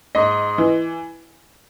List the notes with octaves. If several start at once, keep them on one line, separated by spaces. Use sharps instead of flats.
G#2 D#5
E3